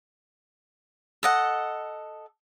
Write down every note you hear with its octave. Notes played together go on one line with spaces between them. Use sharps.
A4 D#5 F#5